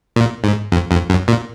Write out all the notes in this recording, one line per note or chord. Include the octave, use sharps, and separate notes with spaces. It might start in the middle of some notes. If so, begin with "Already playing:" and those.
A#2
G#2
F2
F2
F#2
A#2